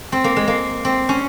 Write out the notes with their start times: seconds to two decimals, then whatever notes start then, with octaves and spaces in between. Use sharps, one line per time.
0.12 C4
0.24 A#3
0.36 G#3
0.48 A#3
0.85 C4
1.09 C#4